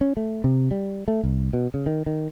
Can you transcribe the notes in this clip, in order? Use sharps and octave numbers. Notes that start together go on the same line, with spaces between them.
C#4
A3
C3
G3
A3
C2
B2
C#3
D#3
D#3